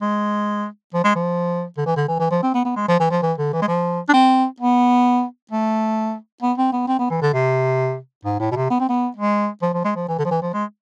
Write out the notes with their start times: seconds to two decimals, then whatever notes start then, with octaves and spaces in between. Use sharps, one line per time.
0.02 G#3
0.94 F3
1.04 G#3
1.16 F3
1.77 D3
1.86 E3
1.97 D3
2.08 E3
2.20 E3
2.31 F3
2.43 C4
2.54 B3
2.65 B3
2.76 G#3
2.88 F3
3.00 E3
3.11 F3
3.23 E3
3.38 D3
3.53 E3
3.62 G#3
3.68 F3
4.09 D4
4.14 C4
4.60 B3
5.51 A3
6.42 B3
6.58 C4
6.73 B3
6.88 C4
6.99 B3
7.10 E3
7.22 D3
7.34 C3
8.25 G#2
8.40 A2
8.52 B2
8.56 C3
8.70 B3
8.80 C4
8.89 B3
9.17 G#3
9.62 F3
9.73 F3
9.85 G#3
9.96 F3
10.08 E3
10.19 D3
10.25 F3
10.31 E3
10.42 F3
10.54 G#3